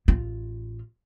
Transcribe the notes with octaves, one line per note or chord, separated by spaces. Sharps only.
A1 F4